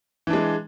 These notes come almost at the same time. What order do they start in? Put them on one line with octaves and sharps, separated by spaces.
E3 D4 G#3